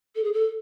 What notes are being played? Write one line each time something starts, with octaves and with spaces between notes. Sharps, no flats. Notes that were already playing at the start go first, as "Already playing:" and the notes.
A4
G#4
A4